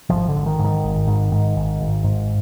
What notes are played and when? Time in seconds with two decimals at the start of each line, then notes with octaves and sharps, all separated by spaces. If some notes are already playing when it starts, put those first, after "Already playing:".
0.10 G#1 F3
0.28 D3
0.35 G#1
0.46 D#3
0.59 G#2
0.64 D#3
0.84 G#1
1.07 G#2
1.32 G#2
1.55 G#1
1.81 G#1
2.04 G#2